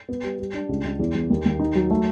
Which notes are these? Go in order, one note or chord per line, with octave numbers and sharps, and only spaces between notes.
B3
G3
G3
D4
C#2
C#2
E2
E2
D#2
D#2
D#4
F#3
A3